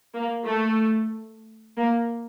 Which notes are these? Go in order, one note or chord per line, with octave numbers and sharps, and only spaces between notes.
A#3
A3
A#3